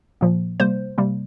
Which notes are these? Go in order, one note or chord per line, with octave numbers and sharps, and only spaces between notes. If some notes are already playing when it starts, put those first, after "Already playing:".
A#2 F3 A#3
C3 G3 A#3 C5
C3 G3 A#3